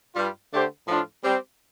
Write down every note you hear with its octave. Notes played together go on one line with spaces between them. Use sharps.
G2 G3 F4
D3 A3 D4 G4 C5
A2 F3 D4 F4
G3 C4 G4